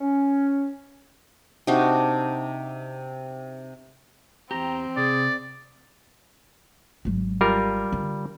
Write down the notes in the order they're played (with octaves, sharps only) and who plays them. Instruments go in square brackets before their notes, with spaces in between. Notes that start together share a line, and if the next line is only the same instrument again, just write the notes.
[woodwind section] C#4
[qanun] C3 D4 D#4 F#4
[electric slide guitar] E2 G4 [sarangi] C4 [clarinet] A#5
[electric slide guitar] C3 [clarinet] G#4 [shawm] D5
[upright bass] G#1 F#3
[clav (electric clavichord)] G3 F4 A#4
[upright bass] D3